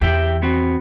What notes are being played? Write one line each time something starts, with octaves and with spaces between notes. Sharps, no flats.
E2 E3 G4 E5 G5
B3 C4 F#4